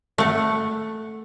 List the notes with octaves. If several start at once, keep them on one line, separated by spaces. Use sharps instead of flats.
A3 F#5